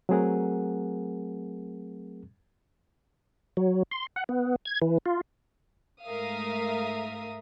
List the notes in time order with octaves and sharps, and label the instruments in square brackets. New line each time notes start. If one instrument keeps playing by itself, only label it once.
[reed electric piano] F#3 A3 C4 G#4 A#4 F#5
[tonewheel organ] F#3
C6
F#5
B3
G#6
E3
F4
[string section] G#2 A3 A#4 E5 F5 D#6